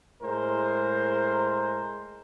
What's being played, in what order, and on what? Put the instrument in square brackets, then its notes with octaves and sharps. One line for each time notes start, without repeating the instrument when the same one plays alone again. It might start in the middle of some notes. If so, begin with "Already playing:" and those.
[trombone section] A2 G#3 A#4 C5